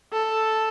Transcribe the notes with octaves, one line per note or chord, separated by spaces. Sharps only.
A4